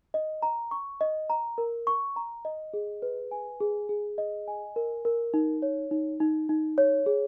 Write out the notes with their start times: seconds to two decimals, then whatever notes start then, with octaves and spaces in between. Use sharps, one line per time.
0.14 D#5
0.42 A#5
0.71 C#6
1.01 D#5
1.30 A#5
1.58 A#4
1.87 C#6
2.16 A#5
2.45 D#5
2.74 G#4
3.02 B4
3.31 G#5
3.60 G#4
3.89 G#4
4.18 D#5
4.48 G#5
4.76 A#4
5.05 A#4
5.34 D#4
5.62 C#5
5.91 D#4
6.20 D#4
6.49 D#4
6.78 C#5
7.06 G#4